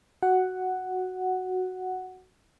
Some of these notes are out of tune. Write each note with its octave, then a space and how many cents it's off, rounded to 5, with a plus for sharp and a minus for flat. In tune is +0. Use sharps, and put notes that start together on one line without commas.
F#4 +0 F#5 +0